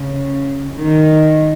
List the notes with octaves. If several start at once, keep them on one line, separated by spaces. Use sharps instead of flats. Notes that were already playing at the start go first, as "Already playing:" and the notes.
Already playing: C#3
D#3